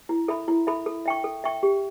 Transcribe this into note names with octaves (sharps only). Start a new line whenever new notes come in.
E4
A4 E5 B5
E4
A4 E5 B5
A4
E5 G5 C#6
A4
E5 G5 C#6
G4